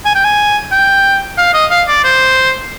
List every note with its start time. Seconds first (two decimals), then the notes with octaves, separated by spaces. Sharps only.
0.05 G#5
0.15 G5
0.24 G#5
0.72 G5
1.38 F5
1.54 D#5
1.71 F5
1.88 D5
2.04 C5